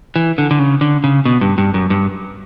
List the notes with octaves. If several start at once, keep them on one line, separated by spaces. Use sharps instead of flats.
E3
D3
D3
C#3
D3
C#3
B2
G2
G2
F#2
G2